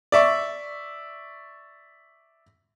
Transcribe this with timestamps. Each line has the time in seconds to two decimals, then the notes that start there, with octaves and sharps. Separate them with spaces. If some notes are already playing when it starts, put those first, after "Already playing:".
0.12 D5 E5 C#6